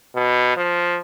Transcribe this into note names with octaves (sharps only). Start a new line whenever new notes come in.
B2
F3